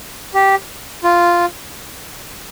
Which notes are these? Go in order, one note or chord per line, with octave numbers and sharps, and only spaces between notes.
G4
F4